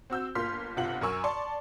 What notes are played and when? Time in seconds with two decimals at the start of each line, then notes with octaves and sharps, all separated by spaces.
0.10 C4 F#4 E6 G6
0.35 G1 A#3 F4 C6 F6 B6
0.77 G1 C3 F4 F#5 F#7
1.01 F#2 A#4 G#5 C#6 E6
1.24 D5 A5 C6 C#6